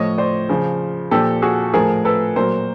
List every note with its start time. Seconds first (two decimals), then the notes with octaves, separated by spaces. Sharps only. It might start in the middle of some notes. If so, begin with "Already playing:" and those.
Already playing: A2 F3 C#5 D#5
0.18 C5 D5
0.49 C#3 F3
1.11 A#2 F3 G4 A4
1.42 F#4 G#4
1.74 A2 F3 G#4 A#4
2.05 A4 B4
2.36 A#2 F#3 A#4 C5